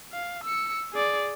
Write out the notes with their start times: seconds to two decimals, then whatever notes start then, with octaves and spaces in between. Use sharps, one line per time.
0.13 F5
0.44 E6 C#7
0.92 G#4 D5